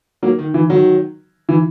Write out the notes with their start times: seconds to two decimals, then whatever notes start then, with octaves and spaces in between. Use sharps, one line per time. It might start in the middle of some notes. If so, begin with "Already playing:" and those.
0.23 F#3 A#3
0.39 D#3
0.54 E3
0.70 D#3 F#3
1.49 E3